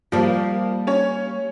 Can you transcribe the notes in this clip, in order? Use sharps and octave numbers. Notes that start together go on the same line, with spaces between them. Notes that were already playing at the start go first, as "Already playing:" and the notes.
F3 G3 A#3
C#4 C#5